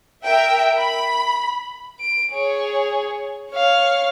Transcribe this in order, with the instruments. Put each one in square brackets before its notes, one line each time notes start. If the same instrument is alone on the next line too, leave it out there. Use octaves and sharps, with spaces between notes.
[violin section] A#4 E5 G5
B5
[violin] D7
G#4 C#5
C#5 F5